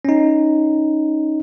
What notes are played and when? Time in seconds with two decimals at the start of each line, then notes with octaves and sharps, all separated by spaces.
0.05 C#4 D#4